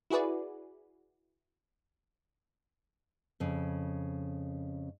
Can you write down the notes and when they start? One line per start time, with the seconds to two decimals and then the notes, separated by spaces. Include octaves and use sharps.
0.10 E4 F#4 G#4 B4 D5
3.40 F2 C#3